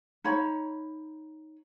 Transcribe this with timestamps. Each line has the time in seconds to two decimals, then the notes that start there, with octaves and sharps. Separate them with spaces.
0.24 D#4 C#5 B5